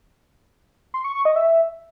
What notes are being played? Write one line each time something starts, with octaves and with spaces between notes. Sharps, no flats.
C6
C#6
C#6
D#5
E5